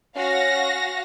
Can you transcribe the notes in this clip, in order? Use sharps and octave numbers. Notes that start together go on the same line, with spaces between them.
C#4 F#4 F5 A#6